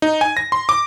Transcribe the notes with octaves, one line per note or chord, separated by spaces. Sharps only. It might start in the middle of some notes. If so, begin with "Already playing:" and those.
D#4
G#5
A#6
C6
D6